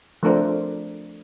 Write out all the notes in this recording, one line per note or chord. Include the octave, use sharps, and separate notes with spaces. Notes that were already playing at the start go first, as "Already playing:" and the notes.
F3 A3 C4 D4 A#4 C5